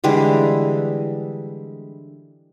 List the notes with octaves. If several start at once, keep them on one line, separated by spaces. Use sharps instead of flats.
D3 E3 G3 G#3